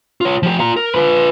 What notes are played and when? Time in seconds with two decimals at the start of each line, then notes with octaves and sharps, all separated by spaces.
0.21 F4 C#5
0.43 F3 G4
0.60 F4 A#5
0.76 A#4
0.95 F4 B4